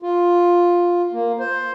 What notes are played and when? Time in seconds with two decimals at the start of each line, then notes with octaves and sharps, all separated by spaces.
0.02 F4
1.13 A#3
1.39 C5